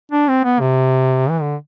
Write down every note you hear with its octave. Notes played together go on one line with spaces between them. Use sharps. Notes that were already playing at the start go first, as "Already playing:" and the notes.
D4
C4
B3
C3
E3
D3